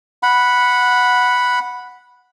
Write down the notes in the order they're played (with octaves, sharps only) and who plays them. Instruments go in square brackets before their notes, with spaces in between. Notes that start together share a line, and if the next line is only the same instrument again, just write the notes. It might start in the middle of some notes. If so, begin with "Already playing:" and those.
[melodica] F#5 B5